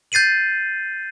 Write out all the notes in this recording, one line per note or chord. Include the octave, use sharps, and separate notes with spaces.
G6 A6 C7 D#7 F#7